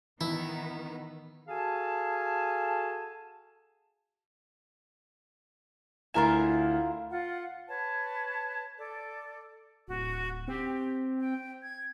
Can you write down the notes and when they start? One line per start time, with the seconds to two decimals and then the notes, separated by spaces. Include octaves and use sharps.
0.21 D#3 E3 B3 E4
1.48 F#4 G#4 A4 F5 G#5 A5
6.14 D2 E4 F4 A#4 G#5 E7
7.10 F4 F5 F#5
7.68 B4 C#5 A5
8.77 A4 D5
9.88 D1 F#4
10.48 C4 G4
11.21 G5
11.63 G#6